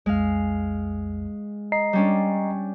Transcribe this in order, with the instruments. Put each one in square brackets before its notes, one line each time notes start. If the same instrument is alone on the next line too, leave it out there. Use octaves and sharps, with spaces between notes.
[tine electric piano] B1 F2 [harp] G#3 F5
[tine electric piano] D#5 A#5 C7
[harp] G3 C#4 D4